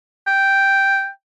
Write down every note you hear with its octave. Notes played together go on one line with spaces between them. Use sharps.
G5